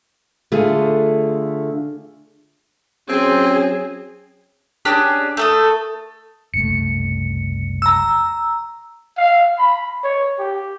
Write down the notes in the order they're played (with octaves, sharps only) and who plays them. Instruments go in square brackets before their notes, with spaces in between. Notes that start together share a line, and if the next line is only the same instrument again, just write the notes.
[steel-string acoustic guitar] D3 A3 F4 G#4
[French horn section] F#3 C#4 [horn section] C4 [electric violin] G#4
[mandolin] C#4 D4 G4 G#4
A3 A4 D#6
[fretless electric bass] F#1 C2 A3 [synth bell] C#7
[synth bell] A#5 E6
[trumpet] F5
B5
C#5
G4